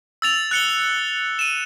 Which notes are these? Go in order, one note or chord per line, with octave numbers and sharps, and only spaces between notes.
E6 A6 F7
F#6 C#7 G7
D#7 E7